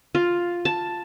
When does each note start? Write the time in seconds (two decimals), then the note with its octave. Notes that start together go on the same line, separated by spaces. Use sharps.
0.15 F4
0.65 A5